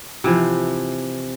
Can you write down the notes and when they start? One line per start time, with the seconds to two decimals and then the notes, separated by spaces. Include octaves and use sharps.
0.24 C3 E3 F3